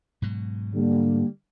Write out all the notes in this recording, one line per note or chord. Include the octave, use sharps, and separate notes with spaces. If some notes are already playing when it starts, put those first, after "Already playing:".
G#2 B2 F#3
D3 G3 A#3